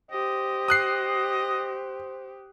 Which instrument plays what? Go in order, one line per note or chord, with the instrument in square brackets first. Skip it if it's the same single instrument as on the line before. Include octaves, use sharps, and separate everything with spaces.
[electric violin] G4 [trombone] C5 [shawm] D#5
[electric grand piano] D#6 F#6 C7